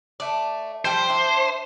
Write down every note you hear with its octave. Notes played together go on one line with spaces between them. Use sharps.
A3 D5
F3 G3 G4 C5
D4 E4